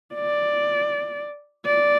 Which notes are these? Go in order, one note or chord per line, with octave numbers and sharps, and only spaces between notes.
D5
D5